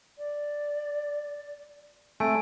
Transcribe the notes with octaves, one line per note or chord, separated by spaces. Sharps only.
D5
A3 C4 G#5 D7